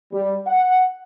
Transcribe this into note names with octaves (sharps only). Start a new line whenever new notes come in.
G3
F#5